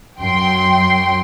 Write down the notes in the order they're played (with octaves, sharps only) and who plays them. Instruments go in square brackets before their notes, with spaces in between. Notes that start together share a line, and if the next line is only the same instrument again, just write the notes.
[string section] F#2 F#3 G5 C6